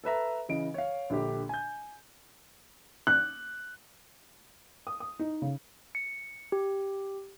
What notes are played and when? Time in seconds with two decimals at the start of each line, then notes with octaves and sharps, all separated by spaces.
0.04 A4 B4 E5 A#5
0.49 C#3 E3 D#5 D7
0.74 C#5 F5
1.10 A#1 D3 G4
1.49 G#5 G6
3.07 F#6
4.87 D#6
5.00 D#6
5.19 D#4
5.42 C#3
5.95 C#7
6.52 G4